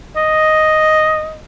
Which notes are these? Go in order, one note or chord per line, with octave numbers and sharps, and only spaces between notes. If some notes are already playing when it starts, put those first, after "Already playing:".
D#5